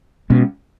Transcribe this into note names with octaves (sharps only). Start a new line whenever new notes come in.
B2 G#3 C#4